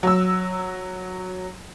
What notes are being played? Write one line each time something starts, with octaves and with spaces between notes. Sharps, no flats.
F#3 E6